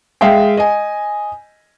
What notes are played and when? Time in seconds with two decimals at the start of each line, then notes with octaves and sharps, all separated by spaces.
0.21 G#3 E5 F5 G5
0.57 D#5 G#5